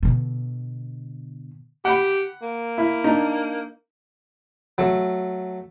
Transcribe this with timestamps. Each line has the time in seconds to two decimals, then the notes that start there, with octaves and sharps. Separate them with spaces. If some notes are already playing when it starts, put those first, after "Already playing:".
0.03 B2 D3
1.85 G4 F#5 B5
2.42 A#3
2.78 E4
3.04 D4 D#4
4.78 F#3 A3